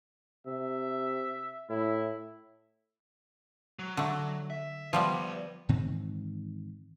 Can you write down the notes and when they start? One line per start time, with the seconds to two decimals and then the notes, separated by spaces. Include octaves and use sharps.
0.46 C3 E5
1.69 A2 E4
3.79 F#3
3.97 D3 A3
4.50 E5
4.93 F3 G3 B3 B4 D5
5.69 G#2 D#3 E3 C4